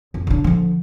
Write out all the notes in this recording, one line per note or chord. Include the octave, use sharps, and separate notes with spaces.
F2
C#3 D4
D3 F3